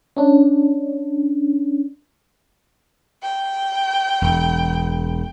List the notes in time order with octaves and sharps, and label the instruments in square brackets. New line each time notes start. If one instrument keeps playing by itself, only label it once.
[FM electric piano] C#4 D4
[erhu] G5
[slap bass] E1